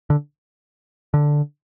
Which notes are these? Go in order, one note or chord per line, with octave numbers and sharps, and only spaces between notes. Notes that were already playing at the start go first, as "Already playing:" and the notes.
D3
D3